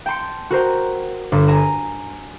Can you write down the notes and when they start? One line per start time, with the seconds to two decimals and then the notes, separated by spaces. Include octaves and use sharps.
0.06 G5 A5 C6 C#7
0.51 F#4 A#4 C5 G5
1.32 G1
1.48 G#5 A#5 D#7 E7